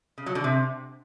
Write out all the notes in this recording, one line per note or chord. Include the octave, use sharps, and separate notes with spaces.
C#3
F#3
D3
C3